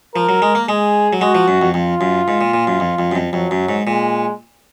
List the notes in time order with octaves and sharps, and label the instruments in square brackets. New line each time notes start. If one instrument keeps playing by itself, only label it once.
[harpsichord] F3 [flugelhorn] A#4
[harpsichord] F#3
G#3
A#3
[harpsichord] G#3 [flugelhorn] G#4
[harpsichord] F#3
[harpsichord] G#3 [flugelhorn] F#4
[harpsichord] F3
F#2
F2
[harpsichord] F2 [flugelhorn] F4
[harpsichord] F#2
G#2
A#2
A#2
F#2
F2
F2
F#2
F2
[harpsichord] F2 [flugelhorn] F#3
[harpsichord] F#2
G#2
[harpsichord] A#2 [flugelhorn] G#3